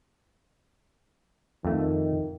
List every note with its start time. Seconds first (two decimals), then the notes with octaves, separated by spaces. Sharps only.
1.65 F2 D#3 A3